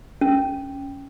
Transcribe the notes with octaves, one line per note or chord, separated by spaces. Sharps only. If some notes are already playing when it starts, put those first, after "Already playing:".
C#4